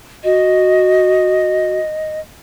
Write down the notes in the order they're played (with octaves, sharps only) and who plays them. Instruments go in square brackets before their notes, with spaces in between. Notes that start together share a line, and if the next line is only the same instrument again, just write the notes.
[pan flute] F#4 [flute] D#5